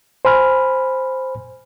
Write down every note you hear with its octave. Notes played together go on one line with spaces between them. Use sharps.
C5 G#5 B5 F6